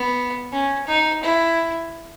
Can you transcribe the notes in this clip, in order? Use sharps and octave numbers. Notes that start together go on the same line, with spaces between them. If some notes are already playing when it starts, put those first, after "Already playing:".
Already playing: B3
C#4
D#4
E4